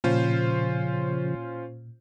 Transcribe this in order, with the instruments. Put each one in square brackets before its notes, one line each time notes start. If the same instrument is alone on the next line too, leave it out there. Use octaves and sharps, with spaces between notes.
[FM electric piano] A#2 [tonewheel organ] C#3 F3 [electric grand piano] C#4 F4 C5